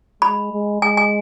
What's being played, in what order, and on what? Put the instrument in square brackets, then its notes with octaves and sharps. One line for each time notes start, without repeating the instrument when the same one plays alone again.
[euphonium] G#3 [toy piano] B5
[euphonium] G#3
[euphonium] G#3 [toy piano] G#5
[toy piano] G#5